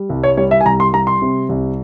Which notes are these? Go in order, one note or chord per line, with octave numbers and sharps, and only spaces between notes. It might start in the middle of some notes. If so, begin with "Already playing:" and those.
Already playing: G3
C2
C#5
G3 C#5
E5
G#5
C2 A#5
C6
G3 A#5
C6
C3
C2